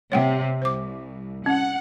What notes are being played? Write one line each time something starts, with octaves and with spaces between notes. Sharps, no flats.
C3 C#5 F#5 G5
C2 C5 D6
C#4 F#5